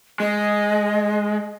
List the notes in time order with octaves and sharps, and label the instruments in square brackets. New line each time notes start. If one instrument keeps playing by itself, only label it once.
[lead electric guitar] G#3 [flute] D#5